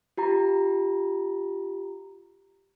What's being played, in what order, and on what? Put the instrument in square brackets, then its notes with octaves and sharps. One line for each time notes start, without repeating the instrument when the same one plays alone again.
[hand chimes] F4 G4 A#5